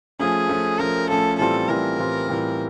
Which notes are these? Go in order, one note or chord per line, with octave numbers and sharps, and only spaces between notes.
F3 A3 C#4 G#4
F3 A3 C#4
F3 A3 C#4 A#4
F3 A3 C#4 A4
A2 E3 G3 C4 F4 A4
A2 E3 G3 C4 F4 A#4
A2 E3 G3 C4 F4
A2 E3 G3 C4 F4